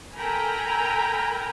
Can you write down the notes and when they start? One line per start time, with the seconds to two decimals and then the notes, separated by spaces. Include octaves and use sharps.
0.16 A4 A#4 G5 G#5 A#5 B5